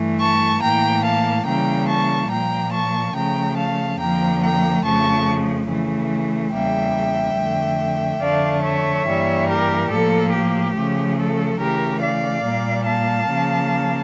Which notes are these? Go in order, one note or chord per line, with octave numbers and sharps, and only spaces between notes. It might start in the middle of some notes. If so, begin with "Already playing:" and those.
Already playing: G2 E3 A3
A5 C#6
A2 E3 A#3 G5 A#5
F5 A5
C#3 E3 G3 A#3 G5 A#5
A5 C#6
A#2 F3 A#3 G5 A#5
A5 C#6
C#3 F3 A3 G5 A#5
F5 A5
F2 D3 F3 A#3 G5 A#5
G5 A#5
F2 C#3 F3 A3 A5 C#6
C#3 E3 A3
E2 C#3 G3 A#3 E5 G5
F2 D3 A3
F2 D3 A3 D5 F5
C#5 E5
G2 E3 G3 A#3
G4 A#4
A2 F3 A#3 A4
G4
C#3 F3 A3
A4
C#3 E3 A3 G4 A#4
D5 F5
A#2 G3 A#3
F5 A5
C#3 F3 A#3